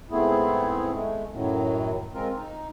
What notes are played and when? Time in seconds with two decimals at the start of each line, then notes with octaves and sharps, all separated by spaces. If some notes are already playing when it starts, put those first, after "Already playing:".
0.11 G#2 A3 B3 C4 E4 G#4
0.94 G#3 A3
1.33 F#2 A2 D#3 F#3
2.14 G#3 C4 F4 A#4
2.37 D#4